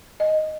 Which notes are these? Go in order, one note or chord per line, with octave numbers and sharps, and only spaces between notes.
D#5